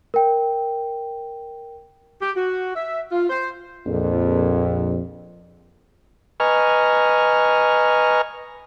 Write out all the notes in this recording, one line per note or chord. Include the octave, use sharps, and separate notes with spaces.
A#4 G5
G4
F#4
E5
F4
C5
A#1 F2
B4 D#5 G#5 A#5 C#6 F6